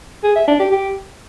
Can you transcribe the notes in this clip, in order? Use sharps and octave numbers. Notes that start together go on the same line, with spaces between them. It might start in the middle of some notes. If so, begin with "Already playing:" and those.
G#4
E5
D4
G4
G4